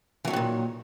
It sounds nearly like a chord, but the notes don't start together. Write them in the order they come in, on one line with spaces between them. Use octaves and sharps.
E3 F#3 D#3 G2 A#2